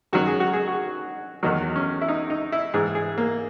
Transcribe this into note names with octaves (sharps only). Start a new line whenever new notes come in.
F#2 D#3 F#3 F#4
G#4
F#4
G#4
F#4
E2 D#3 F#3 D#4
C#4
E4
D#4
D#4
E4
G#2 E3 G#4
G#4
A#3